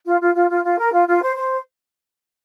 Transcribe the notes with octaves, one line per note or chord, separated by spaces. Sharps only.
F4
F4
F4
F4
F4
A#4
F4
F4
C5
C5